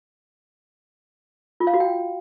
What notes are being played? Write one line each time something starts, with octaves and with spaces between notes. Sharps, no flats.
F4
F5
F#4
G5